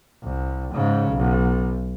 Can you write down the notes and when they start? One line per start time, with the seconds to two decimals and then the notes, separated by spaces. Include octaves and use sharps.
0.23 C2
0.74 G#2 C#3
1.12 B1